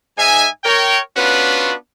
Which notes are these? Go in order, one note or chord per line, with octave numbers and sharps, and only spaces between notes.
G#2 D#4 E5 G#5
A#4 C#5 G5
B3 C#4 D4 F4 F#4 B4